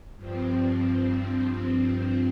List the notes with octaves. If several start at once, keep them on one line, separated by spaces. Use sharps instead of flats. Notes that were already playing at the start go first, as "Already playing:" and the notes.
G2 F3 C4